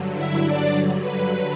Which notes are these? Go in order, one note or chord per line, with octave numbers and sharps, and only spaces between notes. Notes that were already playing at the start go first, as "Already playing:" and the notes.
Already playing: G2 D3 F#3
E4 E5
D4 D5
B4